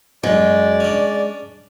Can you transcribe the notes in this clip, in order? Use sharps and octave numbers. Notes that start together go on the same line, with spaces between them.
F#2 F#3 G#3 D5
C#4 D4